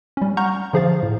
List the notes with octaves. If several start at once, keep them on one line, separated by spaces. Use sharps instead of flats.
G3 C#4
F#5 A#5 C#6 F6 G6
D3 F3 G#4 C5 F5 A6
A2